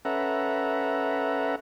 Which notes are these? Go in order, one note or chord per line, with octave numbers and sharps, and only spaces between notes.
C#4 A4 B4 E5 F#5 A#5